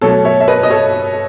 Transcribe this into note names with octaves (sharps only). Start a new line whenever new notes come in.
B2 F#3 A3 A4 C#5
C#5 E5
E5
B4 D#5
D#5
A4 C#5